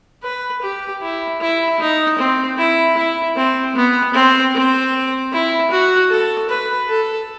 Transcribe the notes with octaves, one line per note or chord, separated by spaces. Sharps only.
B4
G4
E4
E4
D#4
C4
E4
E4
C4
B3
C4
C4
E4
F#4
A4
B4
A4